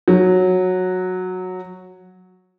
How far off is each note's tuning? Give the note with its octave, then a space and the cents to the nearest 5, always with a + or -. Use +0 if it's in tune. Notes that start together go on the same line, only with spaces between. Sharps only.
F#3 -10